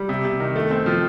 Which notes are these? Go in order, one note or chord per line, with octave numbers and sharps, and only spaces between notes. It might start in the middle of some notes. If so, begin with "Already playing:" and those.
Already playing: G3
C3
C3
D#3
A3
C4
F3